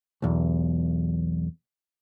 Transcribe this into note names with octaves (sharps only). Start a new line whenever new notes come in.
B1 E2